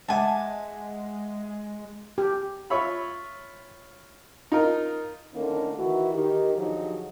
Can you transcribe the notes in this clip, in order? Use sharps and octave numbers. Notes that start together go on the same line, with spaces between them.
G#3 E5 F#5 G#5 A5 D6
G4
F4 C#5 E5 B5
D#4 F4 A#4
D3 D#3 A3 A#3 C#4 E4
D#3 E3 E4 F#4
D#3 G4
D3 F3 F#3 D#4 G4 G#4